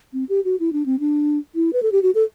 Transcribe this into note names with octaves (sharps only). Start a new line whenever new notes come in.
C4
G4
F#4
E4
D4
C4
D4
E4
B4
A4
G4
F#4
A4